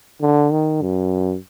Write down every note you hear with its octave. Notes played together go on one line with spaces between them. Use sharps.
D3
D#3
F#2